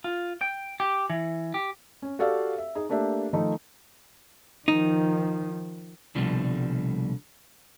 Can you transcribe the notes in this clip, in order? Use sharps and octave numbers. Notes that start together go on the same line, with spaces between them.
F4
G5
G4
E3
G4
C#4
F#4 G4 A4 D5 F5
E5
D#4 G#4
A3 A#3 D4 G4 E5
D#3 F3 A3 D#4
D#3 F3 D#4
C2 B2 D3 F3 G3